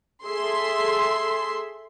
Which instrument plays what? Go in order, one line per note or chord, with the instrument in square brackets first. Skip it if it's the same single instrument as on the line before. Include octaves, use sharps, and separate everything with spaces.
[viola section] G#4 A4 E5 [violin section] C6